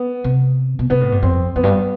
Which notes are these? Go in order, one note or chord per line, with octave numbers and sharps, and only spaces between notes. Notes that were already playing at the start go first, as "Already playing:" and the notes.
Already playing: B3
C3
B2
C3 B3
A2
G2
F2 C4
F2 B3
G2